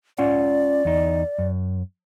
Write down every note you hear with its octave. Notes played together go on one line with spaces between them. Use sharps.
C#4 F4 D5 F#5
E2 D#4
F#2